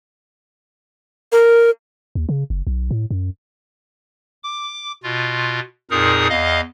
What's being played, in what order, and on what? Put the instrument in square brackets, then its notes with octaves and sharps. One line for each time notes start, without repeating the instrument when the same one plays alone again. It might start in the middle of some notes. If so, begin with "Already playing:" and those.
[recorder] A#4
[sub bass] D#2
C#3
F#1
B1
A2
F#2
[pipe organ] D6
B2 F4
F2 A#2 D#4 G#4 A#4 D#6
E2 D#5 F5